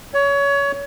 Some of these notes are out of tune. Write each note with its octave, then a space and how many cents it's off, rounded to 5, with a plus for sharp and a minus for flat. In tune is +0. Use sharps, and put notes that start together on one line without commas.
C#5 +25